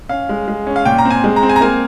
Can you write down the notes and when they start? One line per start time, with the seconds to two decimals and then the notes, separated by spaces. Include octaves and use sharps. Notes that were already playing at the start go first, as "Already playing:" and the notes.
0.09 C#4 F5
0.29 G#3
0.48 G#3
0.67 C#4
0.76 F5
0.85 A#2 G5
0.98 A#5
1.05 C4
1.10 G#5
1.24 G#3
1.36 A#5
1.43 C4
1.49 G#5
1.56 A#5
1.61 A#3 G#5